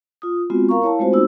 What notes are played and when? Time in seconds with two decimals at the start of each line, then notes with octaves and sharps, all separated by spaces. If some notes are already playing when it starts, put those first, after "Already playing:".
0.22 F4 D#6
0.50 G#3 B3 C4 F4 F#4
0.69 A#4 F5 A#5 C#6
0.82 E4 C#5 F5 A5
0.99 G#3 A3 C4 F4 F#4 C5
1.13 B3 D#4 F#4 E6